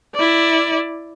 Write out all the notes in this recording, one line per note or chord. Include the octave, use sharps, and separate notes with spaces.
E4 D5